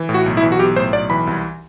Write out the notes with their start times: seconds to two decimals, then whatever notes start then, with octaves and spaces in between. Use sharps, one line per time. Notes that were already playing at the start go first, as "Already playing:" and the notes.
Already playing: E3
0.09 A2
0.14 F#4
0.26 B1
0.37 E4
0.42 E3
0.52 F#4
0.59 B1 G4
0.76 A2 C5
0.93 B1 D5
1.10 E3 B5
1.27 C2